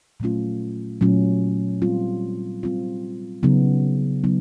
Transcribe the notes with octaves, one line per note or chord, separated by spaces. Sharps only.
A#2 F#3 A3 C#4 F4
A#2 F#3 A3 C#4 F4
G3 C4 F4
G3 C4 F4
C#3 F#3 B3 D#4
C#3 F#3 B3 D#4